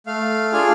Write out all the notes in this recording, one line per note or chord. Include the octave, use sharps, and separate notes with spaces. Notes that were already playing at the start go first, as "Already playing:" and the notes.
A3 F5
D4 F4 G#4